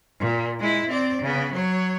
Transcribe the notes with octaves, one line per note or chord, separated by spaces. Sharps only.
A#2
G#3 E4
C4 D5
C#3 B3
F#3 C#5